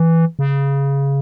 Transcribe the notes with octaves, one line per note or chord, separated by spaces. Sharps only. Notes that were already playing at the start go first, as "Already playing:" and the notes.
Already playing: E3
C#3